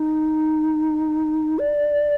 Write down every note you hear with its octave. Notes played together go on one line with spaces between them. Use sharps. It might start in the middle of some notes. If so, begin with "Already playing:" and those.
Already playing: D#4
D5